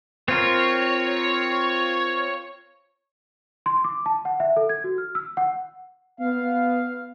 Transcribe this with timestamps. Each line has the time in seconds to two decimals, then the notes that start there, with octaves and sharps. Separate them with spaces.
0.28 C4 F4 A#4 C#5
3.66 C6
3.84 D6
4.06 A5
4.25 F#5
4.40 E5
4.57 A4
4.69 G#6
4.84 F#4
4.98 F6
5.15 E6
5.37 F#5
6.20 B3 F5